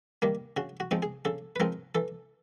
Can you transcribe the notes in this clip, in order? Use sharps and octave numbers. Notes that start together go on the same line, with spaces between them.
D#3 G3 A#3
C#3 F#4
F#4
F3 G#3 C4 D#4
G#4
C#3 A4
B4
F3 G#3 C4 D#4 A#4
E3 A4